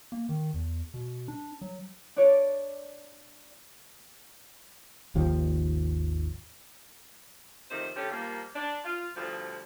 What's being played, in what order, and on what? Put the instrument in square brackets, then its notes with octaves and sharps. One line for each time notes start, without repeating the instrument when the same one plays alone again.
[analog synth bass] A#3
D#3
E2
B2
D4
F#3
[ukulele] D4 C#5 D5
[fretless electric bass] G#1 D#2 F3
[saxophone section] C3 D#3 F3 A3 C5
D3 A3 C#4 G4 A4
F3 G3 A#3
D4
F4
D2 G2 F3